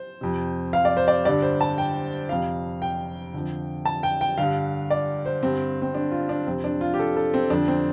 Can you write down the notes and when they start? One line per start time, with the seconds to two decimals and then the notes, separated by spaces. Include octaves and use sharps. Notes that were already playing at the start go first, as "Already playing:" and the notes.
Already playing: C5
0.21 F2 C3
0.73 F5
0.85 D5
0.97 C5
1.08 D5
1.25 G2 D3 D5
1.42 C5
1.61 A5
1.78 G5
2.29 F2 C3 F5
2.82 G5
3.34 F2 D3
3.85 A5
4.03 G5
4.21 G5
4.38 G2 D3 F5
4.90 D5
5.26 C5
5.43 G2 D3 C4
5.82 C4
5.94 D4
6.11 F4
6.29 D4
6.47 F2 C3 C4
6.64 D4
6.81 F4
6.94 G4
6.99 A4
7.16 A4
7.34 C4
7.50 F2 D3 D4
7.68 C4